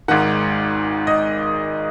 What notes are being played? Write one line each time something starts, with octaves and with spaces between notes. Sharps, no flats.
G#1 G#2 D#3 F#5
D#5